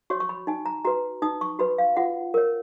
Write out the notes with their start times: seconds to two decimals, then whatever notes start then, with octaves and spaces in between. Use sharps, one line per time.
0.10 F#4 C#5 C#6
0.20 C#6
0.29 B5
0.47 D#4 G#5
0.66 A#5
0.85 F#4 B4 A#5
1.22 D#4 D#6
1.41 C#6
1.59 F#4 B4 B5
1.78 F5
1.97 F4 F#5
2.34 A#4 C#5